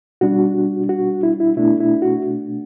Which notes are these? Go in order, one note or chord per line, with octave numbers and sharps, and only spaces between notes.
B2 G3 D4 F#4
F#4
E4
E4
B2 A3 D4 E4
E4
F#4